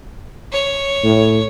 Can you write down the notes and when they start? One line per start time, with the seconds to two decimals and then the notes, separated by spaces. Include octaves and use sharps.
0.52 C#5
1.04 A2